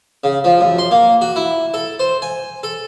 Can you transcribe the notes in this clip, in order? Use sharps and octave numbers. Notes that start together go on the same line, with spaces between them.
C#3
F3
F#2
C6
A#3
F#4
E4
A4
C5
G#5
A4